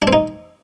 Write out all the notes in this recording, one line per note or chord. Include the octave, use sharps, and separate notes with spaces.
D4
C4
D#4